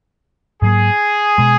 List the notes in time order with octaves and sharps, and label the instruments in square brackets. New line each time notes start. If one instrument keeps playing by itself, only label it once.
[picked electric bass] G#2 F#3 A#3 [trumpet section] G#4
[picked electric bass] B2 G#3